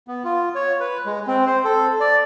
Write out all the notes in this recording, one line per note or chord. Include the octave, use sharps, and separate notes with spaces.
B3
F4
C#5
B4
G#3
C4
C5
A4
D5